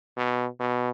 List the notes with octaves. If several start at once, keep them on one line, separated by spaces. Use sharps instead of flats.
B2
B2